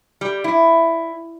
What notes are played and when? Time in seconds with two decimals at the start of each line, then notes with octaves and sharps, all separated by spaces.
0.21 G3
0.44 E4